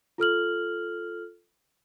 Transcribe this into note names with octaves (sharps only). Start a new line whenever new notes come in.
F4 A4 F6 F#7